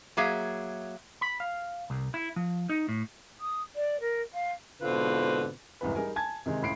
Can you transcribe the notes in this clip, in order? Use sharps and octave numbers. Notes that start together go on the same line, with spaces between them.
F#3 A#3 G#4 E5
B5
F5
C2
E4
F3
D#4
A2
D#6
D5
A#4
F5
G#2 B2 D3 C4 F4 B4
F1 C2 G#2 E3 B4
G3 D#4 G#4 A#4 G#5
G#5 A5 G#6
C3 D#3 G#3
C#2 A2 B5 C7 D7